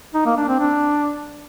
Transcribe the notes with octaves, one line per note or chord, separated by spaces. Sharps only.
D#4
A#3
D4
C4
D4